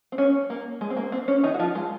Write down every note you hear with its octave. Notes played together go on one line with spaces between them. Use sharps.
C4
C#4
A#3
G#3
C4
A#3
C4
C#4
D#3 D#4
F#4
F3 F4
G#3